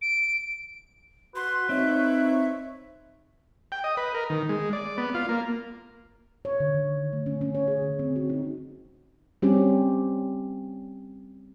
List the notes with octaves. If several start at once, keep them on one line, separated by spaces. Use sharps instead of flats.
D7
F#4 B4 C6
C4 D#4 C#5 E5
G5
D#5
B4
A#4
D#3
G#3
D5
B3
F4
A#3
C#5
D3
D#3
A3
C#4
C#4
C#5
G#4
D3
C4
F#4
D#4
G3 C4 C#4 G4